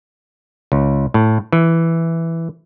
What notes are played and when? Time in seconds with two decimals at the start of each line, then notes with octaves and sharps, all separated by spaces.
0.72 C#2
1.14 A2
1.53 E3